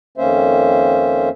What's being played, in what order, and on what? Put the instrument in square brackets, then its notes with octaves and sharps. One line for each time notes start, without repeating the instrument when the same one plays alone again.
[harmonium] F2 D#3 A#3 C#4 C5 E5